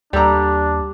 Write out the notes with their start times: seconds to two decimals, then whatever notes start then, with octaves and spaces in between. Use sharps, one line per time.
0.13 D#2 G3 D4 G4 A4 A#5